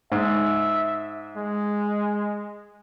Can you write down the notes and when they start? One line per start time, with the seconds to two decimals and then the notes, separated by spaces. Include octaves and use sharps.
0.12 G#2 E5
1.37 G#3